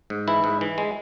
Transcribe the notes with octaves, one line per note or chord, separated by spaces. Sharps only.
G#2
E3 E4
G#2
E3
G#3